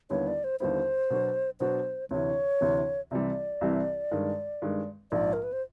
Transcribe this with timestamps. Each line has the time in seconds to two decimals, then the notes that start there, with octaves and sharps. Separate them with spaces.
0.10 D#2 D3 G3 B3 E4 C#5
0.27 D5
0.44 C5
0.60 D#2 D3 G3 B3 E4 C5
1.10 B2 F#3 B3 D4 F#4
1.60 B2 F#3 B3 D4 F#4 C5
2.11 D2 C3 E3 C#5
2.61 D2 C3 E3
3.11 C2 C3 E3 G3 D5
3.61 C2 C3 E3 G3
4.11 G2 D#3 G#3
4.62 G2 D#3 G#3
5.12 A#1 G#2 F3 D5
5.33 A#4
5.43 B4
5.53 C5